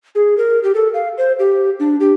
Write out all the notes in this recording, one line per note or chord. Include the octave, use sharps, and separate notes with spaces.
G#4
A#4
G4
A4
F5
C5
G4
D4
G4